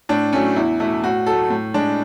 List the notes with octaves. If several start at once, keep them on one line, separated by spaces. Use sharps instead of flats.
A2 D4
F#3 A3 C#4
E2 E4
B2 A3 E4
A2 F#4
F#3 A3 A4
A2
G#3 D4